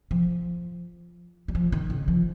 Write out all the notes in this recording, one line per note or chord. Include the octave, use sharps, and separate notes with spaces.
F3
G3
F3
D#3
C#3
F3